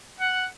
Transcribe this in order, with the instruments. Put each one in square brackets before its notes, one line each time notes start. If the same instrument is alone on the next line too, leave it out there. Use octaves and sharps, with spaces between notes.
[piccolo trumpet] F#5